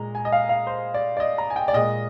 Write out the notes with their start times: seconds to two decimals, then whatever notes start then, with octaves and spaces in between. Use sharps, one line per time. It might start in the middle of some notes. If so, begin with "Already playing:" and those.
Already playing: A#2 G#3 A#5
0.15 G#5
0.25 D#5
0.32 F5
0.49 F5
0.67 C5
0.94 D5
1.17 D5
1.20 D#5
1.38 A#5
1.50 G#5
1.56 G5
1.68 D5
1.73 A#2 G#3 D#5